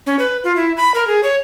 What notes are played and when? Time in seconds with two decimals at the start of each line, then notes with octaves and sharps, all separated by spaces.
0.06 C#4
0.19 B4
0.44 F4
0.56 E4
0.77 B5
0.94 A#4
1.07 G#4
1.23 C#5